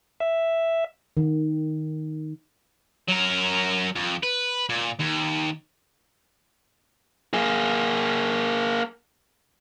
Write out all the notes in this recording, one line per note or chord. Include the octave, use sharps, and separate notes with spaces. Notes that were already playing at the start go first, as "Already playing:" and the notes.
E5
D#3
F#3 A#4
F2
B4
A#2
D#2
A#3 G#4